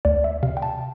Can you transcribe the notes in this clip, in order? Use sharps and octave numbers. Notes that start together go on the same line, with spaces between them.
D2 D5
E5
C3 F5
G5
A5